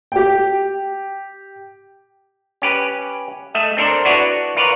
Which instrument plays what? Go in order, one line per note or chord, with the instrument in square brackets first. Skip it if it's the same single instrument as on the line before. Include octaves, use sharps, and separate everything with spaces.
[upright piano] G4 G5
[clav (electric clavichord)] C#4 G4 B4
A3 D#5 E5
C4 D4 A4 A#4 C5 D5
D4 E4 F#4 B4 C#5 D5
F4 A#4 B4 C#5 D5